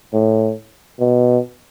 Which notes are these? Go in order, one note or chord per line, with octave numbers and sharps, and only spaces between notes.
A2
B2